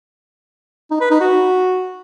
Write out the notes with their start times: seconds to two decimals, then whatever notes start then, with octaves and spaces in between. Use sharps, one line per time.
0.91 D#4
1.01 B4
1.11 D#4
1.21 F#4